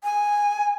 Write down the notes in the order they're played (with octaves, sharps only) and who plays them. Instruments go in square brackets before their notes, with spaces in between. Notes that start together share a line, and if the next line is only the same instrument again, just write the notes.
[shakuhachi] G#5